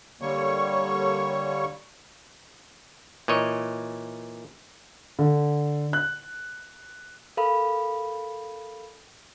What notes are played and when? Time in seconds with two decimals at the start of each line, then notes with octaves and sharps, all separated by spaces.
0.21 D3 G3 A#3 C#5 C#6
3.28 A#2 E3 C#5 D#5
5.19 D3
5.93 F#6
7.37 A4 A#4 F5 B5